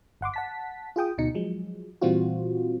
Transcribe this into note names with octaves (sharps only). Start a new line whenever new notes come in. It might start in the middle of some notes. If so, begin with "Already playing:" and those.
G1 F#5 C6 D6
F#5 A5 B6
F4 G#4 G5 D#6
D2 B2 D#4 C#7
F3 F#3 G#3
A#2 E3 G3 C4 F4 F#4